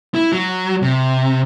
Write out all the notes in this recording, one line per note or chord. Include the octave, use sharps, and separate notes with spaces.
E4
F#3
C3